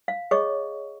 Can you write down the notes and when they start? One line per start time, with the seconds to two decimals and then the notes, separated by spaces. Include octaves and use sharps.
0.08 F5
0.31 G#4 C#5 D#5 C#6